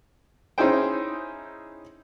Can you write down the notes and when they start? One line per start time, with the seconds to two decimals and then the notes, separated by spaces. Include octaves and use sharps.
0.58 C#4 D#4 E4 G#4 C5 G5